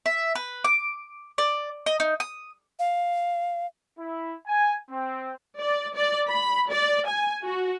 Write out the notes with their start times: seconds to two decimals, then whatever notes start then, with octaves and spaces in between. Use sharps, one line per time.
0.06 E5
0.35 B4
0.64 D6
1.38 D5
1.86 D#5
2.00 D#4
2.20 D#6
2.79 F5
3.99 E4
4.47 G#5
4.90 C4
5.59 D5
5.95 D5
6.29 B5
6.71 D5
7.07 G#5
7.43 F#4